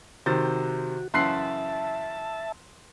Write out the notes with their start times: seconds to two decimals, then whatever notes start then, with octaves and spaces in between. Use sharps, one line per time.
0.26 C3 D#3 F#4 C5 A6
1.14 F#2 C#3 E3 E5 A5 C6 F#6 C7